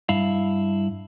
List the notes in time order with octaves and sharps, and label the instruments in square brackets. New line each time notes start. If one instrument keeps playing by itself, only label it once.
[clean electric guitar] G2 E4 F5